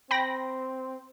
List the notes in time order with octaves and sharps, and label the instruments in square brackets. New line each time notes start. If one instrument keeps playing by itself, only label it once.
[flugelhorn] C4 [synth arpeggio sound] G5 B5 A#6